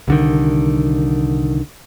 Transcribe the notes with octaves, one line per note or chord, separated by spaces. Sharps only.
C2 D3 D#3